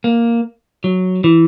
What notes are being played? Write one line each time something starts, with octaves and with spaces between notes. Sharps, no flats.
A#3
F#3
E3